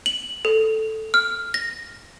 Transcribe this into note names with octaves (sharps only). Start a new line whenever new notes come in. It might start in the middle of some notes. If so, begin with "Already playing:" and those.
F#7
A4
F6
A#6